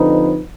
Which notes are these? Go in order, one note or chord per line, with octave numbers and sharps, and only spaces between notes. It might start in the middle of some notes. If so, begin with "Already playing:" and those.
Already playing: D3 F3 C4 D#4 B4